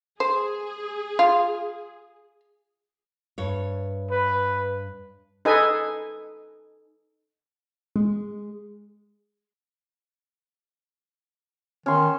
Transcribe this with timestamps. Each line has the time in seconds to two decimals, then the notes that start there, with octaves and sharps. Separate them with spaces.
0.20 G#4 C5
1.19 F4
3.38 G2 C#5
4.11 B4
5.45 D#4 G#4 A4 B4 D#5 G#5
7.96 G#3
11.86 D#3 C#4 C6